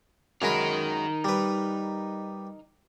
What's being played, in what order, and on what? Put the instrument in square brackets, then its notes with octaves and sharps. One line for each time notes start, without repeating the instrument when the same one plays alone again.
[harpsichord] F#2 G#3 B5 [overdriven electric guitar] D#4 A#4
[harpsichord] G3 B4